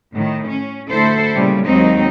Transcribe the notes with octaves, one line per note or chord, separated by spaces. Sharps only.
A2 D#3
C#4
D2 E4 A4 C5
A#2 C#3 G3
D#2 F#3 G#3 C4 D#4